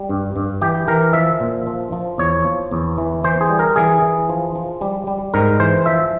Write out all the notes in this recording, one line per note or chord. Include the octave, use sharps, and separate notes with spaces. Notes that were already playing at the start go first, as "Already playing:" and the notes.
Already playing: G3
G2
G2
E3 G4
E3 A#4
F3 E5
A#2
F3
F3
E2 C#5
F3
E2
E3
E3 C5
G#4
G3
A#4
E3 G#4
E3
F3
F3
G3
G3
G#2 A#4
E3 C5
F3 E5